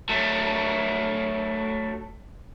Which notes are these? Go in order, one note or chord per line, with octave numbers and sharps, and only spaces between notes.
F#3 A3